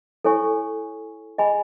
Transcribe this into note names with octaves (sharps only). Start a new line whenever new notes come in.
E4 A4 C#5 G#5 C#6
G#4 D#5 G#5 B5